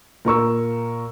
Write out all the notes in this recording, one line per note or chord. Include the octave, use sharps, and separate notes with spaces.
A#2 A#4 C#6 E6